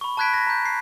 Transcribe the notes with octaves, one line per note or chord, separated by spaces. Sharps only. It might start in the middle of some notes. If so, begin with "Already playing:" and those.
B5 C#6
A5 B5 F#6 G#6 B6 D7
A#6 B6
A#5 G6
C7